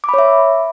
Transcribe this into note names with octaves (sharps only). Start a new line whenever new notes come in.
C#5 E5 B5 D6